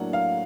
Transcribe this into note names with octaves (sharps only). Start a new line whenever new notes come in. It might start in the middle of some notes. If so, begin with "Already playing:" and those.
Already playing: A2 F#3 A#3 D4 F#5
F5